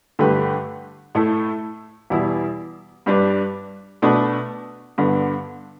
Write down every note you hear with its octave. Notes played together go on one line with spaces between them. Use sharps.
G2 D3 A3 G4 B4
A2 A3 E4 A4
E2 B2 G3 E4
G2 G3 D4 B4
B2 A3 D4 B4
G2 D3 B3